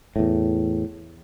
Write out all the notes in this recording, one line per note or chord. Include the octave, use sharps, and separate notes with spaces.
E2 A2